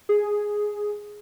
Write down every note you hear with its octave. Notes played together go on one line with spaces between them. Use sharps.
G#4